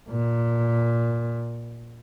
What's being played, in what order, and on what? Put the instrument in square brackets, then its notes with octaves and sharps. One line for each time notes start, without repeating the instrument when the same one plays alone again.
[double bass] A#2